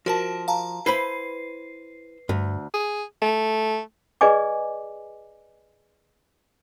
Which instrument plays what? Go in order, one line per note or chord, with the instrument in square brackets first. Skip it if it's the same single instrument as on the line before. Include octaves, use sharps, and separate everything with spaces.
[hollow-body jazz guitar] F3 [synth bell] F#4 A#4 A5
[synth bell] F5 A5 A#5
[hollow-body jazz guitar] E4 C5 B5 [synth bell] B4 C7
[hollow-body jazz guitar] D2 [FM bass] G2
[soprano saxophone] G#4
A3
[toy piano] G#4 B4 D5 D#5 G#5 D6